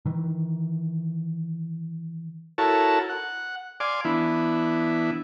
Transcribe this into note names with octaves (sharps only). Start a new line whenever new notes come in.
D#3 E3
E4 F#4 A4 A#4 C#5 A5
F#5
D5 F5 G#5 C6 D6
E3 B3 D4 E4